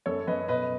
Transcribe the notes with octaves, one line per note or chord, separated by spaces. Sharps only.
F#2 A4 C#5
F#2 B4 D#5
B2 B4 D#5